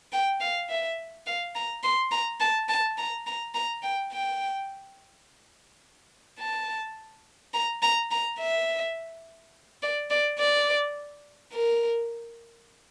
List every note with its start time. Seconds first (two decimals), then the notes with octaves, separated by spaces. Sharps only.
0.12 G5
0.41 F5
0.70 E5
1.27 F5
1.55 A#5
1.83 C6
2.12 A#5
2.40 A5
2.69 A5
2.98 A#5
3.27 A#5
3.54 A#5
3.83 G5
4.12 G5
6.40 A5
7.54 A#5
7.82 A#5
8.11 A#5
8.40 E5
9.83 D5
10.10 D5
10.39 D5
11.53 A#4